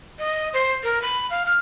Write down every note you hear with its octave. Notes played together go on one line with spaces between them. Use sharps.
D#5
C5
A#4
B5
F5
F6